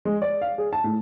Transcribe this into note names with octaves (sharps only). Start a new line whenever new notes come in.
G#3
D5
F5
G#4
A5
A2